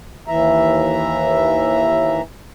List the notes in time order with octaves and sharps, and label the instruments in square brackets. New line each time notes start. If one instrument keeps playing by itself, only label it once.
[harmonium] D#2 E3 E5 A#5